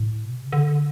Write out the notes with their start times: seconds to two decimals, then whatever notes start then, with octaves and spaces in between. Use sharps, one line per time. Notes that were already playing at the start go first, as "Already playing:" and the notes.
Already playing: A2
0.25 B2
0.34 C3
0.44 C#3
0.53 D3